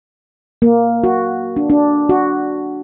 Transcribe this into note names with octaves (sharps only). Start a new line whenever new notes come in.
A#3
F#4
D4
D4
F#4